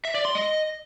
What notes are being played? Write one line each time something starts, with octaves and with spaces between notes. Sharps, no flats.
E5
D5
C6
D#5